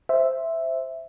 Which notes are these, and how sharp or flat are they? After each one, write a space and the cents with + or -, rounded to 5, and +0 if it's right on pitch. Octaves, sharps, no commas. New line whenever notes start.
C5 +0 E5 +0